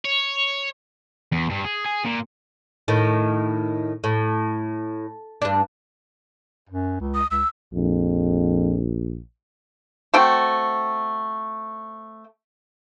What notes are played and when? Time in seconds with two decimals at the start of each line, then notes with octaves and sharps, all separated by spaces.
0.05 C#5
1.32 E2
1.50 G2
1.65 G#4
1.86 G#4
2.05 A#2
2.88 A2 D#3
4.04 A2
5.42 G2 D4
6.69 F#2
7.00 C#2
7.14 D#6
7.31 C#2 E6
7.74 A#1 F2
10.14 A3 C4 F#4 G5